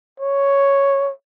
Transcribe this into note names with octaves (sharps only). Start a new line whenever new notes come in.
C#5